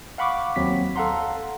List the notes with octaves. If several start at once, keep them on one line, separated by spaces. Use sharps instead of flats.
F5 F#5 B5 C#6 D6
D#2 F#3 C4 B6
A4 F5 F#5 A#5 C6